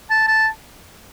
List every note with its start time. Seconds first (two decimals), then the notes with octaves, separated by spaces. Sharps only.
0.10 A5
0.28 A5